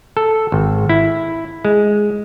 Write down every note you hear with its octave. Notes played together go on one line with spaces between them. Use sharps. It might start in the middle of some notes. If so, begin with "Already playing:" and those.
A4
G#1
E4
G#3